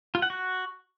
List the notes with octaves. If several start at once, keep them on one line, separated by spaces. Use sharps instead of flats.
F4
F#5
F#4